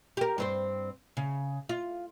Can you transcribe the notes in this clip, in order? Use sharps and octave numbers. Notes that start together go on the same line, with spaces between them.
G4 A#4
G2 C4 C5
C#3
F4